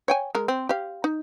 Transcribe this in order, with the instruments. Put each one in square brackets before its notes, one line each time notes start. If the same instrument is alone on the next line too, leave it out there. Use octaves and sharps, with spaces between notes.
[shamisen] C#5 G5 G#5
G#3 A#4
C4
G4 F5
D#4